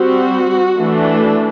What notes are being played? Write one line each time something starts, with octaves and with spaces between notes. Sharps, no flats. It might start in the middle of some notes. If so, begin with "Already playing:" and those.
Already playing: G3 C4 F#4
E3 A3 D4